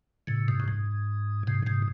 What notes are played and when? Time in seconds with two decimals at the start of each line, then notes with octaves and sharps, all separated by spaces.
0.27 A2 C#3
0.48 G#2 C3
0.60 F#2
0.68 G#2
1.47 G#2 C3
1.66 G#2 C3